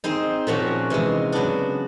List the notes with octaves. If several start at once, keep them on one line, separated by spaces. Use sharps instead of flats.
C4 D#4 G#4 C5
A#2 F3 A#3 C#4 F#4
C3 E3 G#3
C#3 F#3 B3 D4